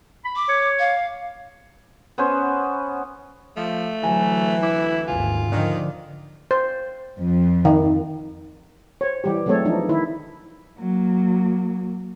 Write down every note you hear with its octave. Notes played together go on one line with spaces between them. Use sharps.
B5
D6
C#5
F5
B3 C#4 C5
F3 A3
D2 E3 F#3 G#5 A#5
E4 D6
G#1 D#2 F4 G#5
D3 D#3 F3 D4
C5
F2
D#3
C5 C#5
E3 G3 G4
F#3 G#3 A3 C4 A4 C#5
E3 F3 D4 D#4
D#3 E4
F#3 A#3